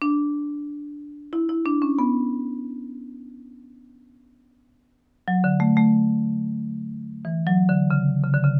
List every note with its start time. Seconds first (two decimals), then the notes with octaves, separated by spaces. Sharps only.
0.02 D4
1.33 E4
1.49 E4
1.66 D4
1.82 C#4
1.99 B3
5.28 F#3
5.44 D3
5.60 A3
5.77 A3
7.25 E3
7.47 F#3
7.69 D3
7.90 C#3
8.23 C#3
8.34 D3
8.44 C#3